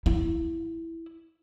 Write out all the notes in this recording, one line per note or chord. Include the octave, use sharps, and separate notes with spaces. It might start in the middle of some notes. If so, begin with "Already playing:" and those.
E4